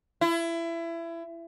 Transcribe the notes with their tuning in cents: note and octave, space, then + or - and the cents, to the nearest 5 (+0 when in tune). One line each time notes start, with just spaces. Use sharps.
E4 +25